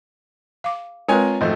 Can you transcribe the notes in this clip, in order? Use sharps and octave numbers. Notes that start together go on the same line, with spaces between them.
F5 D6
G#3 C4 F4 A#4 B4 C#5 G#5
G#1 F2 A3